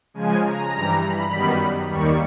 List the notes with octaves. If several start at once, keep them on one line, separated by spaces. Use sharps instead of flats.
C#3 F3 G#3 G#5
A#5
G2 E3 G3
B5
F#2 D#3 G3 B3
D#2 D#3 G3 A#3 C#6